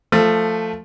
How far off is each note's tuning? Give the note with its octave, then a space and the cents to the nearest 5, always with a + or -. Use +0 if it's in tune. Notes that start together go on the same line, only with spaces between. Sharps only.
F3 +0 A3 +10